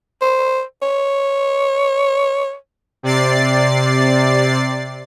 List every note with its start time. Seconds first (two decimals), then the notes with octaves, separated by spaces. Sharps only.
0.21 C5
0.82 C#5
3.03 C3 D5 A6 C7